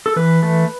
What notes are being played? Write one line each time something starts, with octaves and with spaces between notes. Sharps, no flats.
A4
E3 B4
A3